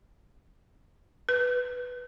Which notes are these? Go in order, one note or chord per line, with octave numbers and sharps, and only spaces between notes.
B4